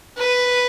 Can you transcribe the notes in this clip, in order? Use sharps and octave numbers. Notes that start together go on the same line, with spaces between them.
B4